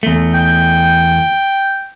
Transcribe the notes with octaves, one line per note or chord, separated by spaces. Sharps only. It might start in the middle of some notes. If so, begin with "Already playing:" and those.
E2 A3
G5